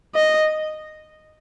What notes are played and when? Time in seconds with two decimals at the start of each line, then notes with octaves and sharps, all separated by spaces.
0.15 D#5